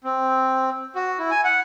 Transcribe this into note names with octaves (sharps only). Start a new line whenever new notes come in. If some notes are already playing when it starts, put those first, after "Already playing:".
C4
F#4
E4
G#5
F#5